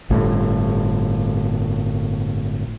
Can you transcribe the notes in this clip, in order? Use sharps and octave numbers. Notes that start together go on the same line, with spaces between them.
G1 A2